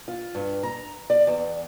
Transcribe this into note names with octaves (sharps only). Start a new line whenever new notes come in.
F4
G2
A#5
D5
E2